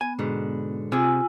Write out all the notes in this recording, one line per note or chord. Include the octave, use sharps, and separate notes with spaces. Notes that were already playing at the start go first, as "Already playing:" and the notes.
B3 G#5
G#2 B2 D3
C3 F4 G#4 G#5 E6